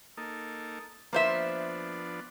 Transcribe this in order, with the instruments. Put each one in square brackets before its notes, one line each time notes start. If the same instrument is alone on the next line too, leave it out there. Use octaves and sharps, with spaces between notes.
[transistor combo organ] A#3 D#4 A4
[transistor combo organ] F3 B3 D4 [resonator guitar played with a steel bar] A#3 C5 E5